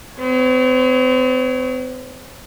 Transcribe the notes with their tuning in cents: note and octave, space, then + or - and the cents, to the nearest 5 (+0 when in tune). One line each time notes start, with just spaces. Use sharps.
C4 -40 C#5 +0